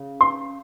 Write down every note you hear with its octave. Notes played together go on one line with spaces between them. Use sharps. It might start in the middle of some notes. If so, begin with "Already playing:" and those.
Already playing: C#3
C6